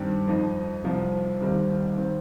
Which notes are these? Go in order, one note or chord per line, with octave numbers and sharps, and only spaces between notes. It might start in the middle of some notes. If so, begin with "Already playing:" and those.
Already playing: G2 D#3 G3 C4 G4
F2 F3 D#4
C2 C3 F3
D#2 D#3 G3 C4 D#4
D#3 C4